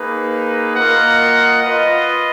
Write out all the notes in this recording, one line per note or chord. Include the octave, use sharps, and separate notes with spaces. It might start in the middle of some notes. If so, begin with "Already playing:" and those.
Already playing: A#3 D#4 G#4 B4
A#3 F4 A#4 D#5 F#5
F4 B4 D#5